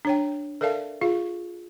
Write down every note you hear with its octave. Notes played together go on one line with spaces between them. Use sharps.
D4 C#5 G5
A4 A#4 D5 E5 F5 A5
F4 G#4 F5